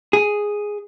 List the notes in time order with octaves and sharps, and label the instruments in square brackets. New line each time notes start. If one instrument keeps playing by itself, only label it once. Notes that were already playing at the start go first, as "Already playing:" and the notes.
[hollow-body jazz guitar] G#4